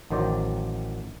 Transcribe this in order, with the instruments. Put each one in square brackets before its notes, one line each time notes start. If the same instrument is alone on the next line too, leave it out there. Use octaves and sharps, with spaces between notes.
[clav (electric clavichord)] A1 D#3 F#3 C5 D5